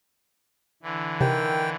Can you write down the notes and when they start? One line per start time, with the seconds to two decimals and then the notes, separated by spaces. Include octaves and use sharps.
0.83 D3 E3
1.21 C3 D#3 G5